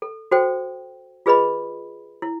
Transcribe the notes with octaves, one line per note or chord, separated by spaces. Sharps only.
A4
F#4 A4 C5 G5
F4 G#4 B4 D#5 B5
E4